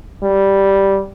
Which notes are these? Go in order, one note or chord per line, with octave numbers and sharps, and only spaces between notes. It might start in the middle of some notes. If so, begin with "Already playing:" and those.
G3